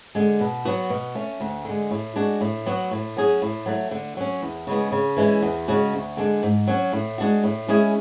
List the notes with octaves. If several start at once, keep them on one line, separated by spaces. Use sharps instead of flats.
D3 G#3
B2
F#3 B3 F#4
B2
A3 C#4
D2
D3 G#3
A2
G#3 D4 F#4
A2
F#3 B3 F#4
A2
F#3 C#4 G#4
A2
F#3 A3
D3
F#3 C#4
E2
C#3 G#3 B3
C#3
E3 G#3 C#4 E4
E2
C#3 G#3 C#4 F#4
D2
D3 G#3 D4
G#2
F#3 C#4 F#4
A2
G#3 D4 F#4
A2
G#3 C#4 E4 G#4